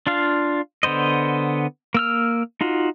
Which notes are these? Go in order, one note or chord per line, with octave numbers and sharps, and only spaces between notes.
D4 F4 F5
D3 B3 C5 D#5
A#3 E6 F6
D#4 F4 F#4